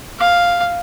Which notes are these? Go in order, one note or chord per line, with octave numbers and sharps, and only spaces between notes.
F5